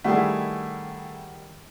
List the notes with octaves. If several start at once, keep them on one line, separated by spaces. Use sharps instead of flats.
D#3 G3 A3 E4 G#4 F#5